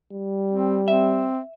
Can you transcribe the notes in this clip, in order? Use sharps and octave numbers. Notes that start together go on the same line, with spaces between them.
G3
C4
C4 E5